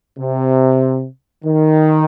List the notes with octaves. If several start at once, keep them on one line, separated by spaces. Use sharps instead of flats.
C3
D#3